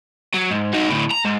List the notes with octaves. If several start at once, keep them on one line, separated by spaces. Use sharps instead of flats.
F#3
G#2
D#4 F#4
D2 A2
A#5
G#2